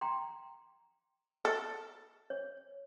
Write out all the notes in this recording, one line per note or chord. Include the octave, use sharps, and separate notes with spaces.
G5 A#5 C6
A4
C#5